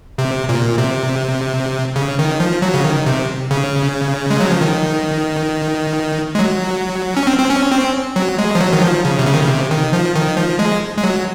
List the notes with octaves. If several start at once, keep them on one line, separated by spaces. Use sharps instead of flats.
C3
A#2
C3
C#3
D#3
F3
F#3
C#3
D#3
C3
C#3
G#3
F#3
F3
D#3
G#3
F#3
C#4
C4
C4
C#4
C4
F#3
G#3
F3
F#3
D#3
F3
C#3
C3
C#3
D#3
C#3
C3
D#3
F3
D#3
F3
G#3
G#3
F#3